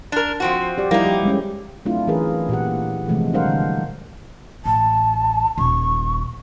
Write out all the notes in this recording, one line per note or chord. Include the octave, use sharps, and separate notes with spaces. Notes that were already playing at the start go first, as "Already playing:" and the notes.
D4 A#4
F3 C4 F#4
G4 D5
F3 G3 A#3 D#4 E4
G4
G3 G#3 C#4
F#3 A3 C4 D4 E4 F4
E3 C#4 G#4 A#4 B4
A#2 G4 F#5
C3 E3 F3 G#3 A3
G3 D4 A#4 C5 F5 F#5
D3
A1 A5
D#1 C#6